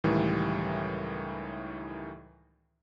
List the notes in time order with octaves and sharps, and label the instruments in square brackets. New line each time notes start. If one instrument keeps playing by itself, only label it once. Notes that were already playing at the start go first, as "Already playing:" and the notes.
[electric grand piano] C#2 A2 D#3 E3 G3